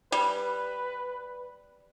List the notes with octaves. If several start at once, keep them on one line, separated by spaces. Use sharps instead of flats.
G3 B4